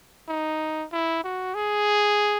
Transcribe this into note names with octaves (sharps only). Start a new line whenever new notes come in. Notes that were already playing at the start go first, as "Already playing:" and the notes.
D#4
E4
F#4
G#4